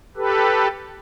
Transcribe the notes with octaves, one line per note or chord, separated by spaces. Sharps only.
G4 A4 B4